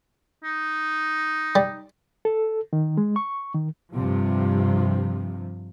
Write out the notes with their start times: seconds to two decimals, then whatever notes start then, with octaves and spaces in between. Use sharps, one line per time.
0.44 D#4
1.55 G3
2.25 A4
2.73 D#3
2.97 G#3
3.16 C#6
3.54 D#3
3.92 G2 C3 F3